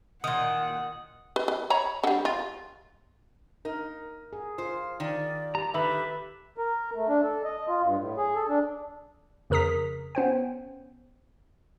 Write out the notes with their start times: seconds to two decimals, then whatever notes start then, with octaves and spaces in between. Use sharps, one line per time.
0.24 A#2 D#3 F#5 D#6
1.36 B4
1.48 B4
1.70 C#5 A#5 B5
2.04 D3 G3
2.25 F4
3.65 D#4 A#4
4.33 G#4
4.58 F4 C5
5.00 D#3 D5
5.55 G4 A#5
5.74 D#3 G4 A4 B4 E5 B5
6.58 A#4
6.96 A3
7.09 D4
7.22 A4
7.44 D#5
7.68 F4
7.84 G2
7.98 A2
8.17 G#4
8.35 A4
8.48 D4
9.50 F2 C#3 A#4 A#5 D#6 B6
10.15 B3 C#4 C5 G5